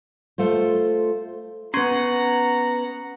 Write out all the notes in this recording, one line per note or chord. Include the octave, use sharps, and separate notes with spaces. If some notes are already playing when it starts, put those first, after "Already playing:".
A3 F4 C5
B3 C#4 F#5 A#5 C6